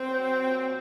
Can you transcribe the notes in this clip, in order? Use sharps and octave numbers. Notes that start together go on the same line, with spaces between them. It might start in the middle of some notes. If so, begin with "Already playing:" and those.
Already playing: C4
F#3
A#2